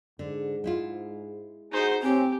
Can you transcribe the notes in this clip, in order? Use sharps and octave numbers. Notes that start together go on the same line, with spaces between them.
G#2 D3
G#3 E4 F4
D#4 F#4 G#4 C5
A2 C4 G4 C#5 G#5